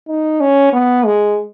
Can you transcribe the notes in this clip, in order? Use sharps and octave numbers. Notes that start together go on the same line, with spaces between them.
D#4
C#4
B3
G#3